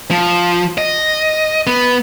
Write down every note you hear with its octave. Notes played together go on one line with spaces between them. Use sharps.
F3
D#5
B3